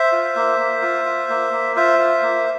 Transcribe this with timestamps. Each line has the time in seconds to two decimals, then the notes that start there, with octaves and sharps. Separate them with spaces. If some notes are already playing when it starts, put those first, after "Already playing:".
Already playing: C5 E5
0.12 F4
0.36 A#3
0.59 A#3
0.82 F4
1.05 F4
1.29 A#3
1.52 A#3
1.76 F4 C5 E5
1.99 F4
2.22 A#3